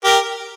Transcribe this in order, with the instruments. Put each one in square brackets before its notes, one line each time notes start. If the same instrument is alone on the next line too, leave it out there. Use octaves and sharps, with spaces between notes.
[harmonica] G4 A#4